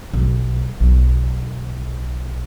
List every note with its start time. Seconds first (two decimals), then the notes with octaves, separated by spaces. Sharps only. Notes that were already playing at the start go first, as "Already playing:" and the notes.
0.14 B1
0.80 B1